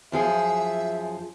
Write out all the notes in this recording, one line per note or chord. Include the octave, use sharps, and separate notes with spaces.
F#2 F3 G#4 E5